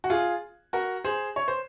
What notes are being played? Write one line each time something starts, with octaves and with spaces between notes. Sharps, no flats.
F#4
F4 G#4
F#4 A#4
G#4 C5
C#5
C5